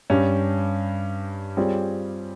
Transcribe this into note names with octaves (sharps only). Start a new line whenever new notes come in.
G2 G3 C#4
G3 C4 F4 G#4 C#5